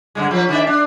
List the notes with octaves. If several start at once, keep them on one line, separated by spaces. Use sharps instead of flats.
G2 D3 G#3
F3 B4
D#3 D4 E5
D4